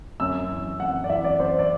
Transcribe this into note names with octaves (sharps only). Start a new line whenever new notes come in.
F#2 E6
E3
F#2 F#5
D5
E3 E5
D5
F#2 C5
D5